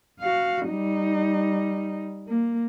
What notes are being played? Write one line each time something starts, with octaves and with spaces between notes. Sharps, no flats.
F#4 F5
G3 D#4
A#3